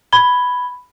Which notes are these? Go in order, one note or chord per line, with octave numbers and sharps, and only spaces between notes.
B5 G#6 G7